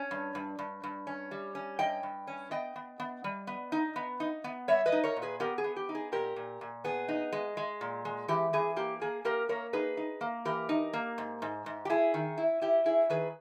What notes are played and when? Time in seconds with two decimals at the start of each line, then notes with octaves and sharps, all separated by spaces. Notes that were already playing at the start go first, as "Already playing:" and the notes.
Already playing: C#4
0.11 G2
0.35 G2
0.59 G2
0.84 G2
1.07 C#4
1.31 G3
1.55 C#4
1.79 G2 D#5 G5
2.03 G2
2.27 C#4
2.51 B3 D#5 G5
2.76 B3
3.00 B3
3.24 G3
3.47 B3
3.72 D#4
3.96 B3
4.20 D#4
4.44 B3
4.68 G3 C#5 E5
4.86 B4 D#5
4.92 D#4
5.04 A#4 C#5
5.17 A#2
5.22 G#4 B4
5.40 B3 G4 A#4
5.58 G#4
5.64 B3
5.76 G4
5.89 D#4
5.95 G#4
6.12 A#2 G4 A#4
6.36 A#2
6.61 A#2
6.85 B3 G#4
7.08 D#4
7.32 G#3
7.57 G#3
7.81 A#2
8.05 G#3
8.28 E3 G4
8.53 E3 G#4
8.76 A#3 G4
9.02 A#3 G#4
9.25 A#3 G4 A#4
9.49 A#3 A#4 C#5
9.73 D#4 G#4 B4
9.97 D#4
10.21 A#3
10.45 E3 G4 A#4
10.69 D#4
10.93 A#3
11.18 G#2
11.42 G#2
11.66 G#2
11.85 G4
11.90 E4 G#4
12.14 D#3
12.38 E4
12.61 E4 G4
12.86 E4 G#4
13.10 D#3 G#4 B4